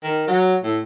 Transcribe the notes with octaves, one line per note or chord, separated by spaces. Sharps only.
D#3
F#3
A2